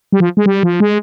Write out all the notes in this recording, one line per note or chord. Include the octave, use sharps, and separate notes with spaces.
G3
F3
G#3
G3
F3
G#3